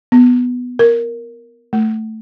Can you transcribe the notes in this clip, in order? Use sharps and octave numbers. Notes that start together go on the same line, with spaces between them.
B3
A#4
A3